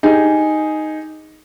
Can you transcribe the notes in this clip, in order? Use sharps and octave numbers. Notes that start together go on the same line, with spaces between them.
D#4 G4 G#4 G#5